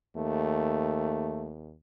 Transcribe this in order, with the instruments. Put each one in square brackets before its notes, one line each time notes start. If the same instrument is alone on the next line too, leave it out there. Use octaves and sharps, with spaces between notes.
[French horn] D#2 [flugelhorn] A3